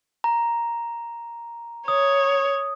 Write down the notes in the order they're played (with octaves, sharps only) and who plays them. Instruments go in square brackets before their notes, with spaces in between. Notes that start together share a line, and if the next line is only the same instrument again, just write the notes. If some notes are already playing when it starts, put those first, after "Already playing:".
[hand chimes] A#5
[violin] C#5 [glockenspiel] D#6